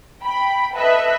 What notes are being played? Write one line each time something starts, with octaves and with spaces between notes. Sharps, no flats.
G5 B5
A4 B4 D#5 E5 F#6